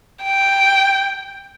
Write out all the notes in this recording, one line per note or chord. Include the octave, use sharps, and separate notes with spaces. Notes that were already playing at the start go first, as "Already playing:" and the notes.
G5